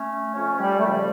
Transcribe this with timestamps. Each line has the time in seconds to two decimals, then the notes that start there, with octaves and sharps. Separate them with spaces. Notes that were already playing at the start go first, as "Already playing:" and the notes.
Already playing: A3 C#4
0.34 F2 C#3 F3 A3 C#4
0.60 G3
0.79 A3
0.85 F2 C#3 F3 G3